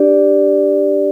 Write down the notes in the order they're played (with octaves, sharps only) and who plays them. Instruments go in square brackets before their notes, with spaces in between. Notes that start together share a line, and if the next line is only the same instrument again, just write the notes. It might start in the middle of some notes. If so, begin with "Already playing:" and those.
Already playing: [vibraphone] D4 G4 D5